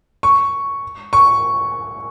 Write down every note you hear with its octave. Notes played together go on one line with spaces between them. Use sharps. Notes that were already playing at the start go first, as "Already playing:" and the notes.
C#6
C#6